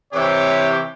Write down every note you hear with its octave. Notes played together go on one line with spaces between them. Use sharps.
C3 E3 G4 C#5